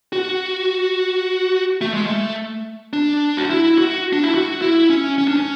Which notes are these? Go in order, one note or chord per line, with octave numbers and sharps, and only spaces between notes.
F#4
A3
G#3
A3
D4
F#4
E4
F#4
D4
E4
F#4
E4
C#4
C#4
D4
C#4